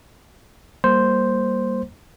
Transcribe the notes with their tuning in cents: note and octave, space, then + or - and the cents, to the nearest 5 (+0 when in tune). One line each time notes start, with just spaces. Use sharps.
G3 +0 A#3 +0 C5 +0